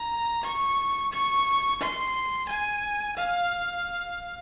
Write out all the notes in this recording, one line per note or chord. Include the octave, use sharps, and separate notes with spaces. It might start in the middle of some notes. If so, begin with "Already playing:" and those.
Already playing: A#5
C#6
C#6
C6
G#5
F5